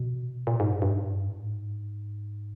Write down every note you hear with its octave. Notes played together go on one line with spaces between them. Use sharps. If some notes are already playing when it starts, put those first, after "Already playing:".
Already playing: B2
A#2
G#2
G2
G2
G#2
G2
A2
G#2